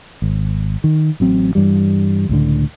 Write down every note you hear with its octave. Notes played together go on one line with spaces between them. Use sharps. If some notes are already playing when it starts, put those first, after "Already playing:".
G#1
D#3
A1 F#3 C4
G2 E3 G3
C#2 A2 D3